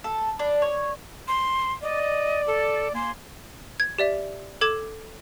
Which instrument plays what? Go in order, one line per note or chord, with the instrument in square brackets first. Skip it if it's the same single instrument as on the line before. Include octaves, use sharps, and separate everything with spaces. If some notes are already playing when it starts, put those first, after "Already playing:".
[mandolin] A4
D4
C#5
[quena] C6
[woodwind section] D5 [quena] D#5
[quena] A4
[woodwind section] A#3 G#5 [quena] C6
[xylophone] G#6
G4 D5 E5
A4 D6 G#6 E7